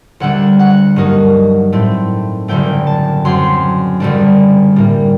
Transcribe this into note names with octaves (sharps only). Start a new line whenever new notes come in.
D2 D3 G3 D4 F#5
F#5
G2 F#3 A#3 D#4
A2 A3 C4
F#1 F#2 D3 F#3 A3 G5
A5
F#2 F#3 C4 C6
F#1 F#2 D3 G3 D4
A2 G3 A#3